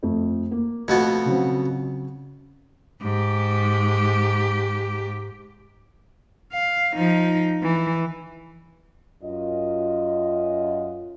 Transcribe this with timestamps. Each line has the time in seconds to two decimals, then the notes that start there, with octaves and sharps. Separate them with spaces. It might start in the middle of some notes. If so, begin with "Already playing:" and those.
0.03 F2 A3
0.51 A#3
0.88 F2 B2 A3 B3
1.25 C#3 F#3 C4
3.02 G#2 G4
6.53 F5
6.95 F3 D#4
7.62 E3
9.23 F#2 F4 D#5